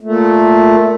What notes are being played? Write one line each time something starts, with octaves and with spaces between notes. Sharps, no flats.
A#2 A3